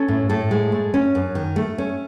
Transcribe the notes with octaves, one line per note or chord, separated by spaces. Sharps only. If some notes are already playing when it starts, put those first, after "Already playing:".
Already playing: C#4 A4
A2
A2 A4
G#3
A3
C#4
F#2
D#3
A3
C#4